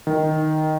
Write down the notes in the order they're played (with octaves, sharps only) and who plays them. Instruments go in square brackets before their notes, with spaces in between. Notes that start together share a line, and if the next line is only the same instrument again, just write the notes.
[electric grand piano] D#3